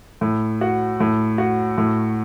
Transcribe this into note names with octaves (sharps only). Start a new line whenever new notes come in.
A2
F#4
A2
F#4
A2